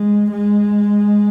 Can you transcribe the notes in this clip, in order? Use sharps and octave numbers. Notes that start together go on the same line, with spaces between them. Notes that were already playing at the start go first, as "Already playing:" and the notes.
Already playing: G#3
G#3